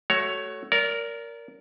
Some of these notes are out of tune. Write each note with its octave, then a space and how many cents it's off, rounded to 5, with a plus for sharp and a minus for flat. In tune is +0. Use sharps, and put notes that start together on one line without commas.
A3 +0 F#4 +20 C#5 +10
A#4 +0 D5 -35